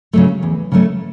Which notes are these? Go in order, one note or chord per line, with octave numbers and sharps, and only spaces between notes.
C#3 F#3 A3
E2
C#3 F#3 A3